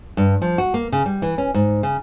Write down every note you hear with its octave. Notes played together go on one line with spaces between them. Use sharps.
G2
F3
F#4
A#3
C#3
G3
E3
C#4
G#2
C#3